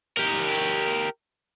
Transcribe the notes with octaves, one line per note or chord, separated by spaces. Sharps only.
G4 A#4